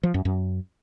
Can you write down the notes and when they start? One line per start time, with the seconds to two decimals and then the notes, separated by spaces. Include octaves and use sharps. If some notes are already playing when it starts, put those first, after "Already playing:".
0.03 F3
0.14 F#2
0.25 F#2